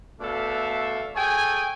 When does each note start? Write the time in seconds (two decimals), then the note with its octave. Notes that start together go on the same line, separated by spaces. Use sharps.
0.21 B2 A3 D4 A4 E5 F5
1.15 G#4 A4 C#5 G5 G#5